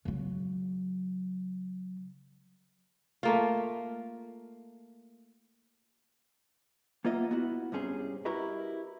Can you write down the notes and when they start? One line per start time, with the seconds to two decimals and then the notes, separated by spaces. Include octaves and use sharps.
0.05 C#3 F#3
3.23 A3 A#3 F4
7.05 A#3 B3 F4 D#5 E5
7.31 B3 E4 F#4
7.72 C2 G2 C3 C#4 G#4 C5
8.25 E4 F#4 G4 A#4 B4 D#5